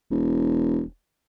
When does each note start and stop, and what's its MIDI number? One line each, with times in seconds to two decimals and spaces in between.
0.10 0.83 28